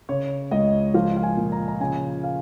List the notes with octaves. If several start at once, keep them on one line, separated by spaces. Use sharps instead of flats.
C#3 C#5
C#2 D#5
F3 F5
F5
G#5
A#2
A#5
A#5
C#3 G#5
F5